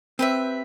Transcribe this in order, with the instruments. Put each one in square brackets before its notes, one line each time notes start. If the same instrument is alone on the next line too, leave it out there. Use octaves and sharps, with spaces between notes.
[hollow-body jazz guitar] C4 [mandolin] G4 B4 E5